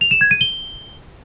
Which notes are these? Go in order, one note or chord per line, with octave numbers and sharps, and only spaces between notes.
F7
E7
G#6
D#7
G7